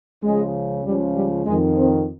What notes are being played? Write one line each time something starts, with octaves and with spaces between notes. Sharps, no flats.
C#2 C#3 F3 G#3
C#2 C#3 F3 G3
G3
F2 D#3 G#3
C4